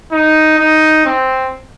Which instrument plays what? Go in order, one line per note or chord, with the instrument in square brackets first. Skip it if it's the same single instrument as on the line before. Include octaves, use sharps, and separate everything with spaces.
[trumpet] D#4
D#4
C4